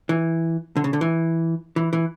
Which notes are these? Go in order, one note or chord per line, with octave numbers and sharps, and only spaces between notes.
E3
D3
C#3
D3
E3
E3
E3